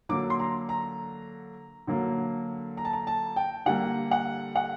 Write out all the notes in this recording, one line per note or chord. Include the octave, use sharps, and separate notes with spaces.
D3 F#3 A#3 D6
C6
A#5
A#5
D3 F#3 A#3
A#5
A5
A#5
A5
G5
D3 G3 A#3 F#5
F#5
F#5